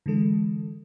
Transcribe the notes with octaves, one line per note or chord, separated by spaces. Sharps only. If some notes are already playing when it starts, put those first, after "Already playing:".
D3 E3 G#3 A4